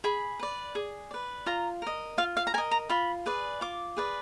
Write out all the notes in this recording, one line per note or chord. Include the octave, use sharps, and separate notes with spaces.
G#4 B5
B4 D5
G#4
B4 D5
F4 A#5
A#4 D#5
F4 F5
F5
A#5
A#4 D#5 G#5
A#5
F4 B5
G#4 B4 D5
F4 D6
G#4 B4 D5